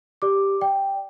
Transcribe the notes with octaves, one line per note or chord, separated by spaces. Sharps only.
G4 D5 D6
D5 G5